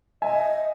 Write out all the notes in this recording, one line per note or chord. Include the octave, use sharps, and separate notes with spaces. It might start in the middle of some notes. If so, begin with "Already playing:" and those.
D#5 E5 G#5